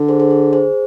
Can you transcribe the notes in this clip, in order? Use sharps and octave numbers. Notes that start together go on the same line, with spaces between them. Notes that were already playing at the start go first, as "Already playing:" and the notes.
Already playing: D3
G#4 C5
G#4 C5
G#4
G#4 C5